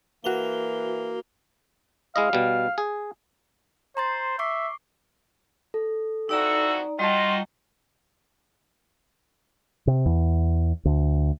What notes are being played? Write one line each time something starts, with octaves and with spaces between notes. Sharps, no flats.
E3 A#3 F#4 F7 G7
G#3 E4 D#5 F5
B2 G3
G#4
C5 A#5 C6 A6
E5 C#6 D6 C7
A4
F2 E3 D#4 F#4 D5 A#5 E6
G3 D#4 F4 F#4 D#5 G5 A5 C6
C3
E2
D2